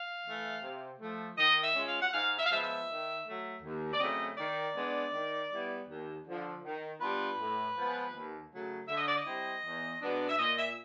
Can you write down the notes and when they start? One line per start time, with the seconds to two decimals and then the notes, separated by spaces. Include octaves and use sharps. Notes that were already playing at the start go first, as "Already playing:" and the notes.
Already playing: F5
0.25 E3 A3
0.62 C3
1.00 F3 A3
1.38 D#3 D#5
1.63 E5
1.75 G#3 C#4 F4
1.88 F5
2.01 F#5
2.12 G#2 F5
2.38 E5
2.45 F5
2.50 F3 G#3 B3 E5
2.63 E5
2.88 D#3
3.26 F#3 A3
3.62 D#2
3.93 D5
4.00 C#3 F#3 A3 C4 D#5
4.37 D#3 D5
4.75 G#3 B3 D4
5.13 D#3
5.51 G3 B3 E4
5.88 D#2
6.25 D3 F3
6.63 D#3
7.00 G3 B3 D4 F4 B4
7.38 A2
7.75 F3 G#3 B3
8.13 D#2
8.50 C#3 F#3 A3
8.88 D3 E5
8.97 D#5
9.08 D5
9.17 D#5
9.25 G3 C4 E4
9.64 E2
10.00 B2 G#3 B3 D4
10.29 E5
10.39 A#2 D#5
10.58 E5